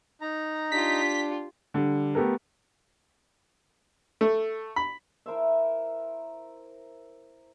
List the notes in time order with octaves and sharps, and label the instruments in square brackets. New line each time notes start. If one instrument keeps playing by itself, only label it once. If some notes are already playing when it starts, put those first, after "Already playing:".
[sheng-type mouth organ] D#4 A#5
[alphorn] D4 [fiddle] F4 G4 [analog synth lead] B6
[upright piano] D3 G3
A3 B3 G4 A4 A#4
[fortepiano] A3
B5
[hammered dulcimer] E4 A#4 C5 E5